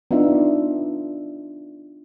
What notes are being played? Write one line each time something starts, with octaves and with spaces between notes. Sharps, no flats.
B3 D4 D#4 F4 E5